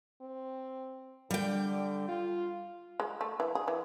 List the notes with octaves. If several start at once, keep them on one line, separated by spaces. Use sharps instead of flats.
C4
D3 G3 G5
F4
G#3
A3
E3
G#4
E3